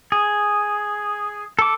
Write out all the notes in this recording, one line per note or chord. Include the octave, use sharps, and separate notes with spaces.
G#4
A4 D6